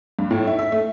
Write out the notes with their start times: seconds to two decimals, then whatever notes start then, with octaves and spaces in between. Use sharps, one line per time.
0.19 G2
0.31 A2
0.47 E4
0.59 E5
0.72 A3